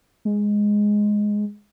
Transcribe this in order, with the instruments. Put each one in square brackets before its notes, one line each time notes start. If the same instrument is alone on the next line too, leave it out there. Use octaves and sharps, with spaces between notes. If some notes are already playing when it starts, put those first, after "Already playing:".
[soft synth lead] G#3